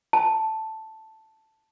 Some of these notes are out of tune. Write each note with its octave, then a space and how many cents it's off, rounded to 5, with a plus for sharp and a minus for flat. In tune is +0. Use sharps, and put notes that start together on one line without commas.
A5 +0